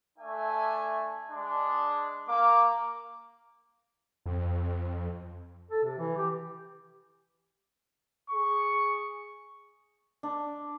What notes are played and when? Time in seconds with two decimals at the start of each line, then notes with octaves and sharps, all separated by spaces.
0.18 A3 D4 E5 G#5
1.29 G#3 D4
2.27 A#3 D6
4.26 F2
5.71 A4
5.84 C3
5.98 E3
6.18 G4
8.29 G#4 C#6
10.23 D4